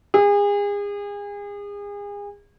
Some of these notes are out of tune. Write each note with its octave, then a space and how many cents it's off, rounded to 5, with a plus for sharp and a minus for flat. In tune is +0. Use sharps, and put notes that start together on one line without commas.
G#4 -35